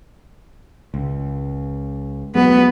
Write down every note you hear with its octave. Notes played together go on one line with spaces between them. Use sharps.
C#2
E1 F#3 G#3 B3